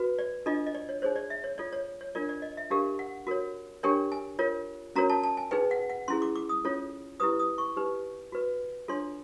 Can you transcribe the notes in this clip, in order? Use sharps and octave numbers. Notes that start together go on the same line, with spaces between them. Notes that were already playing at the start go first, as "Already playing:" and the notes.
Already playing: F#4 B4
D5
D4 F4 A4 D#5
D#5
D5
C#5
D#4 G#4 C5 C#5
D5
E5
C#5
F4 A4 C#5 D5
C#5
C#5
D4 F4 A#4 C#5 D5
D5
D#5
E5
D4 G4 A#4 F5
F#5
F#4 A#4 C#5
D4 G4 A#4 C#5 G5
G#5
F4 A#4 C#5
C#4 F#4 A#4 C#5 A#5
A5
A5
G#5
D#4 G#4 B4 G5
F#5
F#5
C#4 E4 G#4 C6
D6
D6
D#6
C#4 F4 A4 C#5
E4 G4 B4 D#6
D#6
C#6
D#4 G4 B4
F#4 B4
D4 F4 A4 C#5 C6